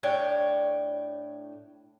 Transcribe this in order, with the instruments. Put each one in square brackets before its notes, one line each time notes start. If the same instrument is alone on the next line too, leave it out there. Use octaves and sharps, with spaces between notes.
[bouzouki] A2 D4 C#5 G5